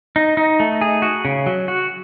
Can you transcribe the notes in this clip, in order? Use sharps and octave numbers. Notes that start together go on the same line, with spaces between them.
D#4
D#4
A3
G#4
F#4
C#3
F#3
F#4